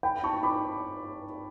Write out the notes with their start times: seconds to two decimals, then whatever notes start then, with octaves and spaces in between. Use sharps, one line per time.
0.03 G5 B5
0.24 A5 C#6
0.43 B5 D6